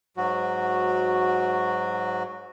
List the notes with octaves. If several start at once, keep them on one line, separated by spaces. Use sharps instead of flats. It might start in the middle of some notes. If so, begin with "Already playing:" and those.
G#2 F#3 F#4